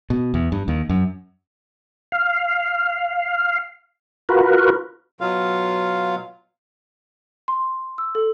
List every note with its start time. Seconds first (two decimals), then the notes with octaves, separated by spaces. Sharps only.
0.10 B2
0.34 E2
0.52 G2
0.68 D#2
0.89 F#2
2.12 F5
4.29 F4 F#4 A#4 B4
5.21 B2 F#3 F4 F5
7.48 C6
7.98 E6
8.15 A4